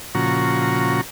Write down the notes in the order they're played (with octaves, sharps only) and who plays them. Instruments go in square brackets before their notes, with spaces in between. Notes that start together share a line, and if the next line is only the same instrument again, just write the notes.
[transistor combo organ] A#2 C#3 F3 F#4 A#5 C#6